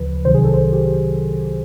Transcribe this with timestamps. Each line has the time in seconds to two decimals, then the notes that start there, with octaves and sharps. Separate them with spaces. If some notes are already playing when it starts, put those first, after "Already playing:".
Already playing: D2 C#3 F3 B4
0.25 C2 C3 D#3 F#3 C5
0.34 G#4
0.44 A4
0.53 C5
0.73 G4